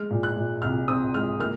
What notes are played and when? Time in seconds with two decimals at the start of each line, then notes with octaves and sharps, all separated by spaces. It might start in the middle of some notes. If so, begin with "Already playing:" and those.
Already playing: G#3 F6
0.10 A#2
0.23 F#6
0.36 A#2
0.62 C2 F6
0.88 C4 D#6
1.14 G#3 F6
1.40 A#3 F6